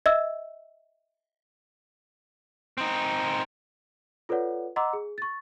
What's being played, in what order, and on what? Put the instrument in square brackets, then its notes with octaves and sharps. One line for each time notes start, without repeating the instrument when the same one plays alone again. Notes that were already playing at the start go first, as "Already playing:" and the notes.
[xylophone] D#5 E5 E6
[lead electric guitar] C4 D#4
[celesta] F4 A4 B4 C#5 D5 F#5
D#5 F#5 A#5 C6 D6 E6
G#4
C#6 A6